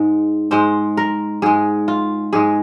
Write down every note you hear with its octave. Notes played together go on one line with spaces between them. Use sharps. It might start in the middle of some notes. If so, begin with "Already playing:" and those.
Already playing: G#2 G#3
G#2 G#3 C5
A#4
G#2 G#3 G#4
F4
G#2 G#3 G#4